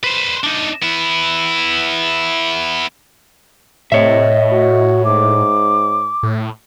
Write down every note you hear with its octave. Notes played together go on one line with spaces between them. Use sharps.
B4 C5
D4 D#4
B3 E4
A2 C3 C#5 D#5 E5
F#4
G#2 D6
A2